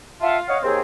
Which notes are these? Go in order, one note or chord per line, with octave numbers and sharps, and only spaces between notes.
F4 E5 F#5 A5
C#5 D#5 F5 F#5
D#2 C4 G#4 C5 C#5